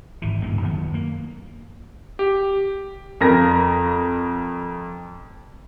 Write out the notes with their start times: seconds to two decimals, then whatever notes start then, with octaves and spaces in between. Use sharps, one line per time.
0.22 G#1 E3
0.42 D1 G2 D#3 A#3
0.61 F#2 D#3 F#3 B3
0.94 A#3
2.19 G4
3.21 F2 A#4 A#6